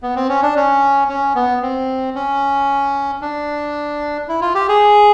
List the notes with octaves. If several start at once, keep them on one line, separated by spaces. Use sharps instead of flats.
B3
C4
C#4
D4
C#4
C#4
B3
C4
C#4
D4
E4
F4
G4
G#4